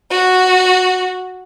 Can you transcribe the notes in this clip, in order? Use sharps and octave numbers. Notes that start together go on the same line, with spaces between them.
F#4